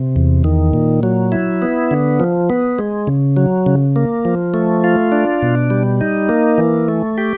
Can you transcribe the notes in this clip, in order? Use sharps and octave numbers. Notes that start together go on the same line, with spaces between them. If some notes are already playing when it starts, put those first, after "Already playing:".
Already playing: C3
E2
D#3
A#2
F#3
E4
B3
D3
F3
B3
G#3
C#3
F#3
C#3
A#3
F3
A3
F4
D4
B2
G3
D#4
A#3
E3
A3
G4